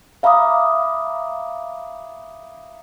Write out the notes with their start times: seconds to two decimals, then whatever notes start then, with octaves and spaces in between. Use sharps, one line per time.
0.23 E5 F5 A#5 B5 D6 D#6